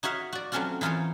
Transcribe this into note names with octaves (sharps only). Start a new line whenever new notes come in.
D#4 F#4 C#5 E5 F5
F#4 D5
F#3 A3 C4 C#4 F4 F#4
E3 D#4 F4 A#4 C5 C#5